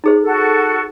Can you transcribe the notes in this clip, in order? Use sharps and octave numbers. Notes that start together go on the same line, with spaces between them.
D#4 G#4 C5
F#4 A4